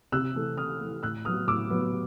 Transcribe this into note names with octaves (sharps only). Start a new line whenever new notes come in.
C3 E6 F#6
E3 A3
C3 D#6 F6
E3 A3
A2 E6 F#6
F#3 B3 D#6 F6
A2 D6 E6
F#3 B3